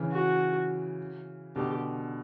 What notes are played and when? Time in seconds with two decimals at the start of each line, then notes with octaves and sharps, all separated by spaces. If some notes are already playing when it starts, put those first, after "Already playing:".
Already playing: C#3 E3
0.12 F#4
1.56 B2 D3 G4